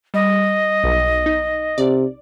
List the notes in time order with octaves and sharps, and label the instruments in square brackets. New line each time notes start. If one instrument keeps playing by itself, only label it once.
[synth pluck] G3 [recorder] D#5
[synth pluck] B1
D#4
[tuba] C3 [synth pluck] D5